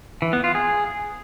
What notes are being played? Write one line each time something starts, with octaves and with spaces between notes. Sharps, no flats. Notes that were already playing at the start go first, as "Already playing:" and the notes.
E3
B3
F4
G#4